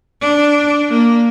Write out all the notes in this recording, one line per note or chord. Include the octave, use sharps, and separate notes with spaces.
D4
A#3